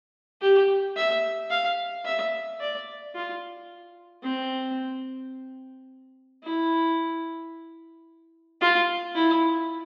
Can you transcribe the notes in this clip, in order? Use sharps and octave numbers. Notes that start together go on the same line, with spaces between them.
G4
E5
F5
E5
D5
F4
C4
E4
F4
E4